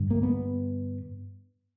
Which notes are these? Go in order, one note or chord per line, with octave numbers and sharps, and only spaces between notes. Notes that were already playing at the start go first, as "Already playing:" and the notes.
Already playing: G2 D3
A#3
B3